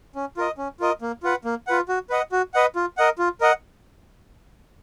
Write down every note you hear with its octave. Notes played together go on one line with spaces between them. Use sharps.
C#4
F4 A#4 D#5
C#4
F4 A#4 D#5
A#3
F4 B4 F#5
A#3
F4 B4 F#5
F#4
B4 D#5 F#5
F#4
B4 D#5 F#5
F4
A#4 D#5 F#5
F4
A#4 D#5 F#5